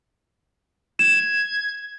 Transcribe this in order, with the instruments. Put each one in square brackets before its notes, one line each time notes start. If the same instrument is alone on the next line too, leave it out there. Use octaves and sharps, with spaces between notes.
[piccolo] G#6 [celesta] E7